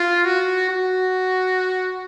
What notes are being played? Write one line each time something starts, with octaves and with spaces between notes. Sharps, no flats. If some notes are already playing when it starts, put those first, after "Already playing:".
Already playing: F4
F#4
F#4